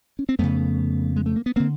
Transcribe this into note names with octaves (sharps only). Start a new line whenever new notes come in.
C#4
C4
F2 C#3 A3 B3
G#3
A3
A#3
B3
D3 A#3 C4